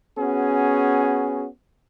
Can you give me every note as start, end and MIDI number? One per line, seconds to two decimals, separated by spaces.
0.18 1.47 59
0.18 1.47 61
0.18 1.47 66
0.18 1.47 68